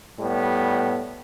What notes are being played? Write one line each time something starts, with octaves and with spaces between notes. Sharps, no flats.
A2 G3 B3